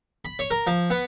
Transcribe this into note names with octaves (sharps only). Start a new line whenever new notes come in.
B5
C#5
A#4
F3
B3